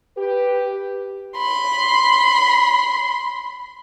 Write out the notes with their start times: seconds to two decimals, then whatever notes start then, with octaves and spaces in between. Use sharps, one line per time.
0.17 G4 B4
1.38 B5 C6